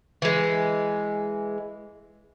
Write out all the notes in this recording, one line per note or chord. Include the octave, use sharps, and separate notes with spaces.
E3 G#3